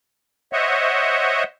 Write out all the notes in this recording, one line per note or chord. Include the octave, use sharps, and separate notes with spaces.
C5 C#5 D#5 E5 F#5